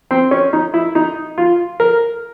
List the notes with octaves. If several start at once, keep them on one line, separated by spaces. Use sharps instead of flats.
C4
C#4
D#4
E4
D#4
F4
A#4